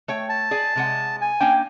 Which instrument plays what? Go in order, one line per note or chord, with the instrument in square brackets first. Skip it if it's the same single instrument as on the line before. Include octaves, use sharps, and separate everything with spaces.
[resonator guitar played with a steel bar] A3 C#5 G5
[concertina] A5
[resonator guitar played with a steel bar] G#4 D5 G#5
C3 G#3 F#5
[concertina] G#5
[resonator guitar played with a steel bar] A#3 C#4 D4 [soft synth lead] G5